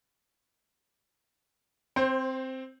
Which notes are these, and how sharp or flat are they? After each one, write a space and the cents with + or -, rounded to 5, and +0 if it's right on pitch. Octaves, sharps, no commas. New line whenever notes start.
C4 +0 C5 +25